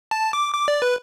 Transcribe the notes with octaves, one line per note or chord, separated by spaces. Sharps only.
A5
D6
D6
D5
B4